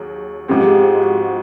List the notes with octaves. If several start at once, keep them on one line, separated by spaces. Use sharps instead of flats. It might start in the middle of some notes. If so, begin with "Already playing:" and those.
Already playing: D#2 F#3 G#4
G#2 F3 G#3 C4 G4
G4
G#4
G4
F#4
F#4